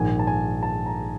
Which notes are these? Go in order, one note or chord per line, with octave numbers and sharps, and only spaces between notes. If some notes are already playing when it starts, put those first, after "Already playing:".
Already playing: A#1 G#2 D#3 G#5
A5
G#5
A5
A#5